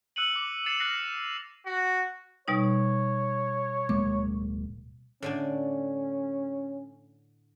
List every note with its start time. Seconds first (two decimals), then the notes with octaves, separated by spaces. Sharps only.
0.16 E6 F#6 C#7 D#7 F#7
0.36 D6
0.66 A6 C7 C#7 E7 F7
0.80 F6 F#6 A#6 C7
1.18 F7
1.66 F#4
2.48 B2 G3 D#4 C#5
3.89 D1 G#3 A#3 D6
5.22 A2 D3 C#4 D4